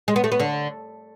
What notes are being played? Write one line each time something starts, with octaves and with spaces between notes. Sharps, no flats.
G#3
B3
A3
B3
D3